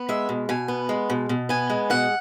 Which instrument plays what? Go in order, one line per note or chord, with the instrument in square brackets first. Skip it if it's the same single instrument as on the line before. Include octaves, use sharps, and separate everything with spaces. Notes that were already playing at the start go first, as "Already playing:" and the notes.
Already playing: [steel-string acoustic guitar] B3
G#3 E5
B2
B2 G#5
B3
G#3
B2
B2
B3 G#5
G#3
B2 F#5